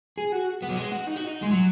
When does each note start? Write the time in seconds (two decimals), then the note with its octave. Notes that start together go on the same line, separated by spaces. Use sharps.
0.18 G#4
0.32 F#4
0.62 B3
0.70 F#3
0.77 G#3
0.92 F#4
1.07 D#4
1.16 F#4
1.27 D#4
1.43 G#3
1.52 F#3